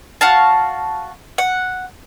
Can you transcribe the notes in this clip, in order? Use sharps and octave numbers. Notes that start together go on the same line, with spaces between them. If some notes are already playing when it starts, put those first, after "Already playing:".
F#4 F5 A5
F#5